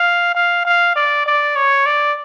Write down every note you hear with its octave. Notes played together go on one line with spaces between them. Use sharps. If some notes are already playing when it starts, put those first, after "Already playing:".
Already playing: F5
F5
F5
D5
D5
C#5
D5